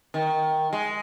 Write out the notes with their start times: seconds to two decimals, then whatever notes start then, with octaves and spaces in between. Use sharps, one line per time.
0.14 D#3
0.73 G#3